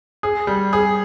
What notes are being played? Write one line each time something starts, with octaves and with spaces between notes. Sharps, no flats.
G#4
G3
G#4